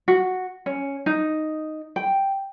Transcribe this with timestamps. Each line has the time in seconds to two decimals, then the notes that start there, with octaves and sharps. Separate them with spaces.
0.08 F#4
0.66 C#4
1.06 D#4
1.96 G5